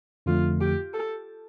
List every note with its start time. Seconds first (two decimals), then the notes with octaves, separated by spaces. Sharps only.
0.26 F2 D3 F3 A3 F4
0.61 G4
0.94 A4